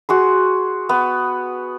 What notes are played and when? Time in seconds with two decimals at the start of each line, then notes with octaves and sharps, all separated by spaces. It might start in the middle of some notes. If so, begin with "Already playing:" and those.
0.09 F#4 G#4 C6
0.89 B3